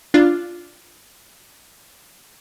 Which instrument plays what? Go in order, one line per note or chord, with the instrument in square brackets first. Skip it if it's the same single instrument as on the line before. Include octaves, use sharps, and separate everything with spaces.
[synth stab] D4 F4